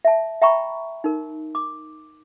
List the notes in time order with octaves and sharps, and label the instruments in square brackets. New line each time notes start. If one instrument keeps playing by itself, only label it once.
[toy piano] E5 A5
E5 G5 A#5 B5 C#6
D#4 A#4
D6